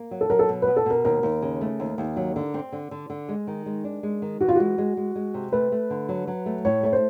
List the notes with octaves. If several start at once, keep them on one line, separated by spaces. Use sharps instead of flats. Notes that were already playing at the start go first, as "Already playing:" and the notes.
Already playing: A#3
F#3
A4
F#3 A#4
A4
B2
B2 B4
A4
B2 A#4
D#2 A#4
D#2
C#3
A3
D#2
D#2
F#3
D3
C4
D3
D3
D3
G#3
D#3
G#3
D4
G#3
D#3
E3 F#4
F4
G#3 F#4
G#3
G#3
G#3
C3
A3 B4
A3
D3
F#3
F#3
A3
A2 C#5
A3 C#5
C5